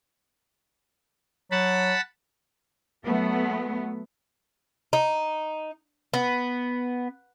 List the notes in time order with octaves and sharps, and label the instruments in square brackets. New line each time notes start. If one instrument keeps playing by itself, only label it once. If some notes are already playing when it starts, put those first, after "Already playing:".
[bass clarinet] F#3 [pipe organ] F#5 A5 B5
[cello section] F#3 A3 B3
[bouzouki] D#4
B3